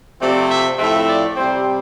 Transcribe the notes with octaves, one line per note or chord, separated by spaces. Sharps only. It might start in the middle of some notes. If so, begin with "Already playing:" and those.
C3 F3 A3 C4 D5
E5
A2 F3 A3 C4 E5
D5
C3 G3 C4 C5